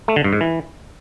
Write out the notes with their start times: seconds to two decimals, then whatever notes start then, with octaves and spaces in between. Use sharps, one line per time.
0.08 A3
0.16 D3
0.24 G2
0.33 G#2
0.41 E3